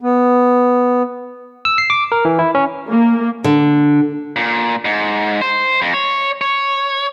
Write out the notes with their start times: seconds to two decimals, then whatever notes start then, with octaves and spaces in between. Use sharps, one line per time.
0.01 B3
1.65 E6
1.78 C7
1.90 D6
2.12 A#4
2.25 E3
2.39 E4
2.55 C#4
2.87 A#3
3.44 D3
4.36 A#2
4.85 G#2
5.41 C5
5.82 F2
5.93 C#5
6.41 C#5